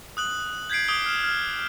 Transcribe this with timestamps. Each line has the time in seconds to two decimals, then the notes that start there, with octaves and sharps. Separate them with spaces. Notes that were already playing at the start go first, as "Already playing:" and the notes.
0.17 D#6 F#6 F#7
0.70 G6 G#6 B6 C7 D7
0.88 D6 D#6 D7 G7
1.06 F6 E7
1.24 F6